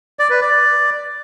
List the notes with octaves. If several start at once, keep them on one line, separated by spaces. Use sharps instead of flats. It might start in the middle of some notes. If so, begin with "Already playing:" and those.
D5
B4
D5